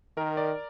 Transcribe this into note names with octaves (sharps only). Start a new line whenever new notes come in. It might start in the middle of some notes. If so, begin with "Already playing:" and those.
D#3 A#4
D5